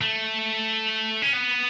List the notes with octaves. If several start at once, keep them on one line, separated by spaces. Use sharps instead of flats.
A3
C#4
B3